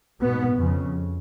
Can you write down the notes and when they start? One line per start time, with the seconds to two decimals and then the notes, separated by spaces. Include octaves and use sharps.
0.22 G#2 B2 B3
0.58 F2 C#3